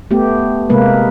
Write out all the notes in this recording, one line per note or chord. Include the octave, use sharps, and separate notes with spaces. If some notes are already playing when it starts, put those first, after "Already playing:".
A3 B3 G4
C3 G#3 A#3 B4